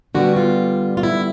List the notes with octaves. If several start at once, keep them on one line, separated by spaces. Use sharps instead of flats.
D3 G3 B3 F#4
F4
F4
E4